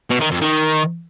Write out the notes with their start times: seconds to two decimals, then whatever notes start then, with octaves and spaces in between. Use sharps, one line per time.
0.10 B2
0.20 D#3
0.31 F2
0.41 D#3